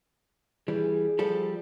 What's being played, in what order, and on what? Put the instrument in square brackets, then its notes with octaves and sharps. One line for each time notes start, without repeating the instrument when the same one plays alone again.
[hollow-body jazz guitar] E3 G3 [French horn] G#4
[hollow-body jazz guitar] F3 G3 A4